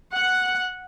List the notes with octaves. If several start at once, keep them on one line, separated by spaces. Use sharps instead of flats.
F#5